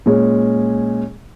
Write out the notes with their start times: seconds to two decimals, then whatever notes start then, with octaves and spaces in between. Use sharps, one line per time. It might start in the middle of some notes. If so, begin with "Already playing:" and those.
0.06 A#2 G#3 C#4